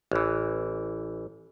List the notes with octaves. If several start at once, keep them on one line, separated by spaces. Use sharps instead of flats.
A1 E3